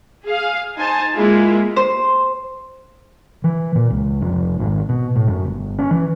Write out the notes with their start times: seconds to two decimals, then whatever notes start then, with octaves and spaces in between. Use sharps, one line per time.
0.25 G#4 F5
0.75 D#4 C5 G#5 A5
1.14 G#3 A#3 E4 F4 G#4
1.76 C5
3.44 E3
3.75 A#2
3.91 C#2
4.21 F1
4.60 G#1
4.89 B2
5.16 A2
5.28 F#2
5.44 G1
5.79 C#4
5.91 E3